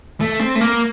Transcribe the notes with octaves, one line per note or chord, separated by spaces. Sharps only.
A3
C4
A3
A#3